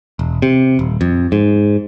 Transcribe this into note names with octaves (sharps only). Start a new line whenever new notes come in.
E1
C3
D#1
F2
G#2